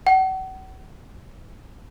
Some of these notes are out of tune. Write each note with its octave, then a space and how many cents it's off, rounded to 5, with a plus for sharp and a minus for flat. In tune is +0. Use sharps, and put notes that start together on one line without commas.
F#5 +40